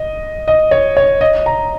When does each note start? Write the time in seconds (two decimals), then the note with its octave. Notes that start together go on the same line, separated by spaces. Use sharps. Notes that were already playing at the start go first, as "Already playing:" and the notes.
Already playing: D#5
0.48 D#5
0.71 C#5
0.97 C#5
1.21 D#5
1.46 A#5